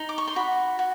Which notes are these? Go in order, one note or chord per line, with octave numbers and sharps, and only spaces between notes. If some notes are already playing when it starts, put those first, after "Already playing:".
Already playing: D#4
D6
C#6
C6
F#4 B5
F#4